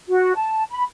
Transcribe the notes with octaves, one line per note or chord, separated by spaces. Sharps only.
F#4
A5
B5